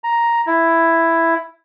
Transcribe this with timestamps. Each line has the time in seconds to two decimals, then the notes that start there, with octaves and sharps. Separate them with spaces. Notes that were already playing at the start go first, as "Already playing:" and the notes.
0.04 A#5
0.47 E4